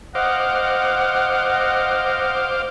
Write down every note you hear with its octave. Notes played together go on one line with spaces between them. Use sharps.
C5 D#5 F5 F#5 D6